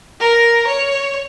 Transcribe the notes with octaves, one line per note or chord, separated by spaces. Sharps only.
A#4
C#5